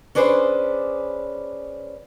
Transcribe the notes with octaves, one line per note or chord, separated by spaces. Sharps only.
C#4 D4 G#4 B4 C5